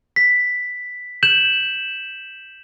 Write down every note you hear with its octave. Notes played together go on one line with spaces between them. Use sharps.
B6
G6 E7 F#7